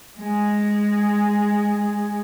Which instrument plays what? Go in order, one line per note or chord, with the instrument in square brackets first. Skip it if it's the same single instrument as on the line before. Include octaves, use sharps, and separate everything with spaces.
[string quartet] G#3 G#4